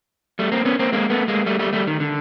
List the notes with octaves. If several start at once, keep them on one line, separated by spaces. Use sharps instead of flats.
G3 A3
A#3 C4
B3 C#4
A#3 C4
G#3 A#3
A3 B3
G#3 A#3
G3 A3
G3 A3
G3 A3
D#3
D3